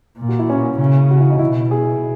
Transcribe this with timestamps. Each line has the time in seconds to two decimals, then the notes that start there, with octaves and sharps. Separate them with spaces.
0.19 A#2
0.29 F#4
0.39 E4
0.50 C#4
0.80 C#3
1.11 F#4
1.20 E4
1.30 D#4
1.39 B2 E4
1.71 G#4